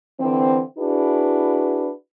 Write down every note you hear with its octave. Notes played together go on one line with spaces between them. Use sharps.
D3 E3 C4
D4 E4 F#4 G#4 B4